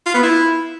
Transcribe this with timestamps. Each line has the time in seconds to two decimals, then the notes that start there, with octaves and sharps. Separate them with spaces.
0.06 F4
0.14 B3
0.23 E4